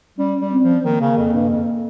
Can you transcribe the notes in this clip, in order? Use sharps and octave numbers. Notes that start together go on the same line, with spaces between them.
G3 C#4
G3
C4
F3
D#3 A#3
C#3
F2
G2
F2